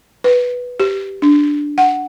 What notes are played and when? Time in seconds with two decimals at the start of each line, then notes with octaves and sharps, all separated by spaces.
0.24 B4
0.80 G4
1.22 D4
1.78 F#5